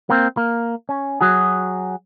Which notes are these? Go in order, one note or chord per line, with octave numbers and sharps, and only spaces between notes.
A#3 C4
A#3
C#4
F#3 F#4 G#4